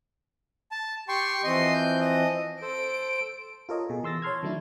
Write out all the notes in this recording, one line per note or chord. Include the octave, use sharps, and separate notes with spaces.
A5
G4 G5 C6 C#6
E3 F3 C4 D#5 C6
G6
D#5
A4 C5 D7
F4 A4 A#4 C#5 D#5
B2 G#4
E3 C6 E6 A6 A#6
C#5 A5 C6 F6 G#6
D#3 F#3 A3 D4 E4